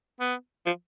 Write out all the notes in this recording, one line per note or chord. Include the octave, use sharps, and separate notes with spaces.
B3
F3